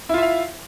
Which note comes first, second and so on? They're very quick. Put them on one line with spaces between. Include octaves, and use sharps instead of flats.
E4 F4 E5 F5